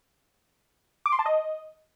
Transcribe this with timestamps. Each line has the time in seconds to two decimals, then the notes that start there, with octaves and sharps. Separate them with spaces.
1.06 D6
1.12 C6
1.19 A5
1.26 D#5